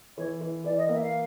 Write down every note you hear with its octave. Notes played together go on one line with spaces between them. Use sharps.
E3 C#5
E3
E3 D5
D#5
A#3 E5
F5